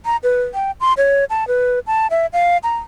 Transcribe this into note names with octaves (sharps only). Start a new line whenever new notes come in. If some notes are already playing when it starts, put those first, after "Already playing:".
A#5
B4
G5
C6
C#5
A5
B4
A5
E5
F5
A#5